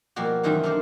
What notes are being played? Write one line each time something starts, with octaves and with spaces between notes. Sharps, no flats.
B2 F3 G3 A#3 F#4
F#2 C3 D#3 E3 G3
D4 D#4 A4 A#4 C5 D5